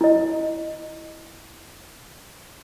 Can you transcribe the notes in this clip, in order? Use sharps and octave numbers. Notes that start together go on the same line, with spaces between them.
E4 D#5